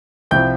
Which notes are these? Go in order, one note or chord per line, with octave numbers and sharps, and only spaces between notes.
C2 C3 F3 G5 G6